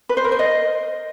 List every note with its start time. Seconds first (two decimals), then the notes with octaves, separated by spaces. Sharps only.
0.09 B4
0.17 C5
0.24 A#4
0.32 C5
0.39 D#5